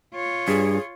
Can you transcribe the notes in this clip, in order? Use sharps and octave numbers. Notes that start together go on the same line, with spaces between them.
F4 C#5
G2 G#4